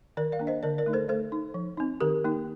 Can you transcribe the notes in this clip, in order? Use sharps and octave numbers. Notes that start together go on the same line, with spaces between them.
D#3 A#4 D5
D5 F5
A#3 D4
C5 D#5
D3 A#4 D5
A#4 D5
A3 D#4
A4 C5
A3 A4 C5
D#4
F3
C4 D#4
D#3 G4 A#4
A#3 D#4